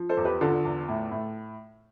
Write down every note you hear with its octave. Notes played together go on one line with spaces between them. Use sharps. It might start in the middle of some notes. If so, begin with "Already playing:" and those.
Already playing: F3
A4 C5
E2
G4 B4
D3 F4 A4
E2
A2
A2